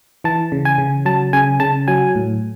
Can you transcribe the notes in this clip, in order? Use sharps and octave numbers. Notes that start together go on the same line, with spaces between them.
E3 A5
C#3
G#5
C#3
F#3 A5
C#3 G#5
C#3 A5
F#3 G#5
A2